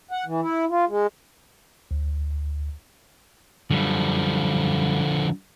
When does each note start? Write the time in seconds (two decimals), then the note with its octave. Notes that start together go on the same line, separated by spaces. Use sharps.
0.11 F#5
0.26 E3
0.41 E4
0.69 F4
0.88 G#3
1.91 D2
3.71 F#2 D3 F3 G3